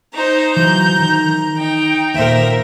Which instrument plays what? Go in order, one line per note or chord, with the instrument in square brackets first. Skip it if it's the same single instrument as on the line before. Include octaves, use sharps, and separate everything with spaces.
[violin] D#4 C5 [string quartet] A#5
[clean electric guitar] E3 F#3 [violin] G6
[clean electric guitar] D#3
[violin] D#4 G5
[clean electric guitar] D#2 A#2 [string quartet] A#4 C5 E5